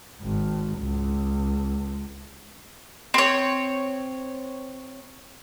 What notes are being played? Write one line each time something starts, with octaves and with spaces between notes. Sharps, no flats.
G#1
C#2
C4 C#5